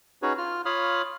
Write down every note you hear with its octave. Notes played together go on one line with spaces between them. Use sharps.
C#4 D#4 F#4 G#4 B4 C#5
F4 F6
F4 C#5 F5 B5 D#6 F6